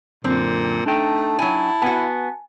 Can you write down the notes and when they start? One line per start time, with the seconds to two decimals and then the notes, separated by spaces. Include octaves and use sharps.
0.24 F#2 A#2 D3 C4
0.86 A3 D4 D#4 G5 A5
1.39 F#3 E4 G#5
1.82 B3 F#4 G#5